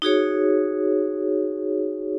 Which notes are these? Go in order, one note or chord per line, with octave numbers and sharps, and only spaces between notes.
D#4 F#4 G#4 C#5